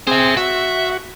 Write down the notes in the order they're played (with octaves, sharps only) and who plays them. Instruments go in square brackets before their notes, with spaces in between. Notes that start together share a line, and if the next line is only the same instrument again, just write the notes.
[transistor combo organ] C4 G#4 [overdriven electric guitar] C5 E5
[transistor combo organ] F#4 [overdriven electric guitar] E5